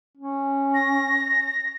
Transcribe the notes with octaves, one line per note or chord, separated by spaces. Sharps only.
C#4
A#6